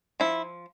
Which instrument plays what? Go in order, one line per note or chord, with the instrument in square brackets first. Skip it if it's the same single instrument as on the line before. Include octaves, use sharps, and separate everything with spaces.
[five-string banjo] F3 E4